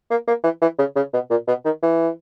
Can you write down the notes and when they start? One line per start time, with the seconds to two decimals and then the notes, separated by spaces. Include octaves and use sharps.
0.10 A#3
0.27 A#3
0.44 E3
0.61 E3
0.79 C#3
0.96 C#3
1.13 B2
1.30 A#2
1.47 B2
1.65 D#3
1.82 E3